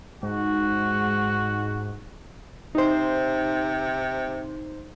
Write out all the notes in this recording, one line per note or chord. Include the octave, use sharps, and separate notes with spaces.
G#2 F#4
C3 D#4 C5